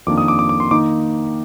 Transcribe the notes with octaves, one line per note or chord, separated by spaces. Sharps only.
F2 D#3 A#3 D4 D6
D#6
D6
D6
D6
C6
D#3 A#3 D#4 D6